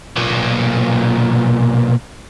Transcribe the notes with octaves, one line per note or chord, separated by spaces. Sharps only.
B1 A#2